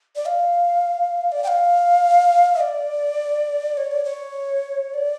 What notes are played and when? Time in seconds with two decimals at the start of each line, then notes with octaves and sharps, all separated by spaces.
0.16 D5
0.27 F5
1.32 D5
1.44 G5
1.48 F5
2.60 D5
3.77 C#5
3.91 D5
4.05 C#5
4.94 D5